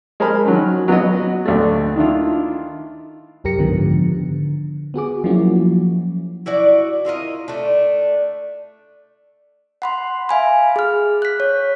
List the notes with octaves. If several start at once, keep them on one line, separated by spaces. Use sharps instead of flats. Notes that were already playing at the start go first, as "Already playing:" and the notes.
G#3 A#4 C5 A5 B5 F6
D#3 F#3 C#4
F#3 B3 F#4 D#5
D2 A3
D#3 D4 E4 F4
C2 F#2 G4 A#4 A#6 C#7
G#2 D3 D#3 F3 B3
D3
B3 F#4 G#4 D6
F3 F#3 A#3 C#4 E4 F#4
E4 F#4 D5
E4 F4 A#4 D#5
A3 D4
F#5 B5 C6
E5 F5 G#5 B5
G#4 F6
F#6 B6
C#5